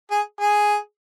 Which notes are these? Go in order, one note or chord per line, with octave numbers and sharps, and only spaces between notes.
G#4
G#4